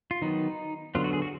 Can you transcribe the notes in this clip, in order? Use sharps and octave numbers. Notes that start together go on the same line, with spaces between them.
F4
D#3 F#3 B3 D#4
D3 F#3 B3 F4
F#4
G#4
F#4